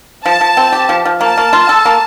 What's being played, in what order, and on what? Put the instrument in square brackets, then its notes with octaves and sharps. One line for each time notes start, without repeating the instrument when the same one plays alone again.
[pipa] F3 [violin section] A5
[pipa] F3
C4
G4
F3
F3
[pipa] A#3 [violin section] A5
[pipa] A#3
F4
A4
A#3